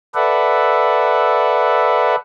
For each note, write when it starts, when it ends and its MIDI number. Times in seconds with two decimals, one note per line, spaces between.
0.15 2.16 69
0.15 2.16 71
0.15 2.16 74
0.15 2.16 76
0.15 2.16 78